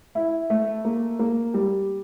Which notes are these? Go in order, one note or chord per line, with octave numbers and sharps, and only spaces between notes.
E4
A3
A#3
A#3
G3